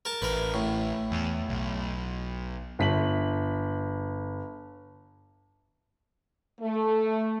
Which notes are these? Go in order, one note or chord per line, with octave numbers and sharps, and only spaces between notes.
A#4 A5
A1 A#4 B4
A2
E2
B1
G1 B6 F#7
A3